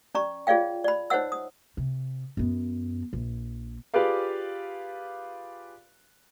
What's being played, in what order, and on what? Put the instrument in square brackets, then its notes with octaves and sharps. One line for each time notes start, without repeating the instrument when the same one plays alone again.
[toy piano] C#4 D5 A#5 C#6
F4 G#4 C#5 D5 F5 G5
D5 B5
D#4 C5 C#5 D#5 F#5 E6
D#6
[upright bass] C3
F#2 B3
A#1
[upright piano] F4 G4 G#4 B4 D5 F5